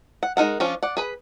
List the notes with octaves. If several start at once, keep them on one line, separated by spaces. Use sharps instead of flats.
F#5
G#3 D#4 A#4 F#5
F3 C#4 D4 F4
D5 F#5
G#4 B4 B5